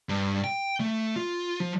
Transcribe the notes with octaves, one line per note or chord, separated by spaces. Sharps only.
G2
G5
A3
F4
F3